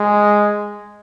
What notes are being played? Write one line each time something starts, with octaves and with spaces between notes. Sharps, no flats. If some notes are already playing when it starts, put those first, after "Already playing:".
Already playing: G#3